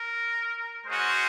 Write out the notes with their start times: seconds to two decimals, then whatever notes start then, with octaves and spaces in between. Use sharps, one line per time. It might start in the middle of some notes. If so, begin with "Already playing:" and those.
Already playing: A#4
0.87 G#3 C#4 F#4 C5